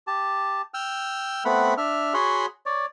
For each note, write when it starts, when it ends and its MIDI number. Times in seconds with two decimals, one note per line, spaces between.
0.07 0.62 67
0.07 0.62 81
0.74 1.44 79
0.74 1.44 88
0.74 1.44 89
1.45 1.74 57
1.45 1.74 59
1.45 1.74 60
1.45 1.74 78
1.45 1.74 83
1.77 2.14 62
1.77 2.14 76
1.77 2.14 89
2.14 2.46 66
2.14 2.46 68
2.14 2.46 73
2.14 2.46 78
2.14 2.46 83
2.14 2.46 84
2.66 2.86 73
2.66 2.86 74